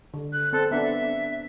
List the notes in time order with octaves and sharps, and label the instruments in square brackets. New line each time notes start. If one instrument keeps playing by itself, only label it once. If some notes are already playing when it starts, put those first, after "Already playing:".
[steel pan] D3
[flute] F#6
[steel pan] C4 [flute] A4
[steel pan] B3 D4 [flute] E5